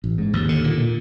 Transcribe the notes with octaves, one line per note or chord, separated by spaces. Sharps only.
A1
G#2
D#2
D3
A#2
A#2